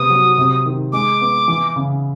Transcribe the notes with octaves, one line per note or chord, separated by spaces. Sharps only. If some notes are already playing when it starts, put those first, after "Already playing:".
Already playing: C3 B3 D#6
F#3
C3
D#3
G#3 D6
B3
E3
C#3